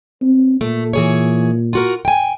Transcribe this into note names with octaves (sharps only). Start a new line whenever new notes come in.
C4
A#2 A3
E3 G#4 C#5
F4 F#4 A#4
G5 G#5